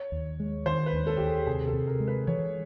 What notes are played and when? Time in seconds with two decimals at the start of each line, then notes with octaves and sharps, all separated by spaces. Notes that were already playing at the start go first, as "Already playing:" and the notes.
Already playing: C#5
0.12 D#2
0.40 G#3
0.66 D#3 C5
0.86 B4
0.93 D#2
1.07 A4
1.17 D#2 G4
1.27 G#4
1.47 C3 G#4
1.67 A4
1.73 C3
1.87 A#4
2.00 G#3
2.07 B4
2.27 E3 C#5